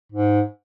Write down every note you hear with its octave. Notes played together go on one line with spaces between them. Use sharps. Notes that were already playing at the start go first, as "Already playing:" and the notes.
G#2